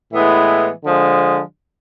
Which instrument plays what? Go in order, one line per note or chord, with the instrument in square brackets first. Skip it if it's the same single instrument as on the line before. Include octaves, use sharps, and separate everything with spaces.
[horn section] A2 E3 G#3 B3 E4
D3 F3 G#3